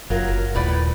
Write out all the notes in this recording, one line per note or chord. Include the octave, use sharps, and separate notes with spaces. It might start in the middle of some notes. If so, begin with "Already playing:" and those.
F#1 F#3 F4 A#4
D#1 A2 B4 D5